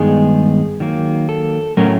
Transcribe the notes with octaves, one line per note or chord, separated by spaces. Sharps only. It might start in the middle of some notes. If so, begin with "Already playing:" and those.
Already playing: G2 D#3 G#3 B3 D#4 G#4
D#3 F#3 A#3
A4
A2 F#3 A3 C#4 A#4